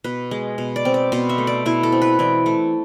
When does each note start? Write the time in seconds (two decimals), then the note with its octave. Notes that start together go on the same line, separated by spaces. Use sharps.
0.04 B2 B4
0.31 G#3
0.58 B2
0.76 D5
0.85 C4
0.94 D5
1.12 B2 C5
1.29 E5
1.38 A3
1.47 D5
1.66 B2 E4
1.83 A4
1.92 C4
2.02 B4
2.19 E3 D5
2.46 A3